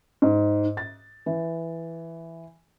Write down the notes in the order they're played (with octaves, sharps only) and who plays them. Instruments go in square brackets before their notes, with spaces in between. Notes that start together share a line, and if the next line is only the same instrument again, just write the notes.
[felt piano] G#2
A6
E3